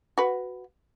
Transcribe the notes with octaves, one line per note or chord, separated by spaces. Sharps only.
F#4 B4